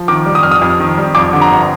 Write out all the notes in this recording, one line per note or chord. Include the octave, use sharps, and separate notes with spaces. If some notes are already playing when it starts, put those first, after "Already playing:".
Already playing: F3
D#3 D6
G3
D#6
F2 F6
D#6
F2
D#3
G3
F2 D6
D3
A#5
G1